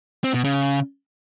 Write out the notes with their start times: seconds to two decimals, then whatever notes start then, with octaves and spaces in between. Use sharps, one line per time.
0.24 C4
0.34 B2
0.44 C#3